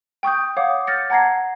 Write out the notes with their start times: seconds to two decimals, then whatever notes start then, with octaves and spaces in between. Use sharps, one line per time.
0.23 G5 C#6 D#6 G6
0.57 C#5 F5 F#5 D6 D#6
0.87 D6 F6 G6 A6 A#6 C#7
1.10 F#5 A5 A#5 G#6 A#6 C7